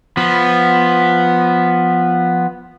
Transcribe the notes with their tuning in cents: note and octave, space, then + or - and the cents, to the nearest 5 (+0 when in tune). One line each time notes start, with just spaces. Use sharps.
F3 +0 B3 +0